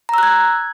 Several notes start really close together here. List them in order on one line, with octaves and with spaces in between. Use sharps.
A#5 E6 F#6 G#6